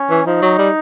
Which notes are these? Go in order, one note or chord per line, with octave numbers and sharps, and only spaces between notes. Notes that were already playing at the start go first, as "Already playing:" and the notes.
Already playing: C#4
E3
F3 D#4
F#3
G3